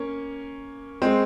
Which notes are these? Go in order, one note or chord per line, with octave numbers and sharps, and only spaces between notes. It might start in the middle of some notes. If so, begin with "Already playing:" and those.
Already playing: A#3 C#4
G#3 C4